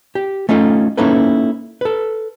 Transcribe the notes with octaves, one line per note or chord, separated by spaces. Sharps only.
G4
A3 C#4 D#4 F4 A4
A#3 C#4 D#4 E4 A4 B4
A4 B4